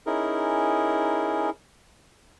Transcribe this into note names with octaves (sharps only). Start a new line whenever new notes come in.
C#4 D#4 E4 G#4 A#4